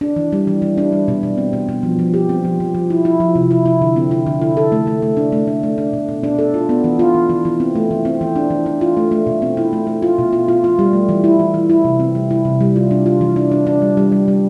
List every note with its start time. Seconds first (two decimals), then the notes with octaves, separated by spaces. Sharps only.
0.01 D4
0.16 E3
0.33 G3
0.47 E3
0.62 E3
0.78 D4
0.93 G3
1.08 B2
1.23 B2
1.38 C4
1.53 B2
1.69 B2
1.83 F3
1.99 F3
2.14 G4
2.29 C4
2.44 F3
2.60 F3
2.75 F3
2.90 E4
3.05 E4
3.20 F3
3.35 C3
3.51 E4
3.66 E4
3.81 D3
3.96 C4
4.11 E4
4.26 D3
4.42 E4
4.57 A4
4.72 A3
4.87 A3
5.02 A3
5.17 D4
5.32 A3
5.47 D4
5.63 A3
5.78 D4
5.93 B2
6.08 B2
6.23 D4
6.39 A4
6.54 F4
6.69 B3
6.84 E3
6.99 F4
7.14 E3
7.30 E3
7.45 E3
7.60 C4
7.75 A3
7.91 E3
8.05 C4
8.21 E3
8.36 D4
8.50 E3
8.66 D4
8.81 F4
8.97 A3
9.12 A3
9.27 B2
9.42 C4
9.57 E4
9.73 A3
9.87 A3
10.02 F4
10.18 B2
10.33 F4
10.48 F4
10.64 F4
10.79 G3
10.93 A3
11.09 E3
11.24 E4
11.39 E3
11.54 E3
11.70 E4
11.85 C3
12.00 C4
12.15 G3
12.31 E4
12.45 C3
12.61 G3
12.76 F4
12.91 D4
13.06 F4
13.21 E3
13.36 D4
13.51 D4
13.67 D4
13.82 G3
13.97 G3
14.12 G3
14.28 G3